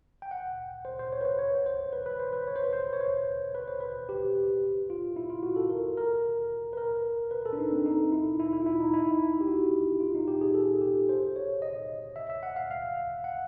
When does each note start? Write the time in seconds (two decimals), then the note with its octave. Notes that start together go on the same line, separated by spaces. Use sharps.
0.22 G5
0.31 F#5
0.85 C5
0.99 C5
1.13 C#5
1.21 B4
1.25 C5
1.39 C#5
1.66 C5
1.93 B4
2.06 B4
2.19 C5
2.33 B4
2.48 C#5
2.56 C5
2.64 B4
2.73 C5
2.93 C#5
3.01 C5
3.55 B4
3.68 C5
3.81 B4
4.09 G4
4.90 F4
5.16 E4
5.30 F4
5.43 F#4
5.56 A4
5.70 A#4
5.97 A#4
6.73 B4
6.77 A#4
7.31 B4
7.45 A4
7.53 D4
7.59 D#4
7.73 C4
7.86 D#4
8.12 E4
8.39 E4
8.53 E4
8.61 F4
8.66 E4
8.80 D#4
8.94 E4
9.02 D#4
9.10 E4
9.40 G4
9.48 F#4
10.00 F4
10.15 D#4
10.28 G4
10.41 G#4
10.54 A4
10.81 G4
11.09 C5
11.36 C#5
11.62 D#5
12.16 E5
12.30 E5
12.43 F#5
12.56 F5
12.71 F5
13.24 F#5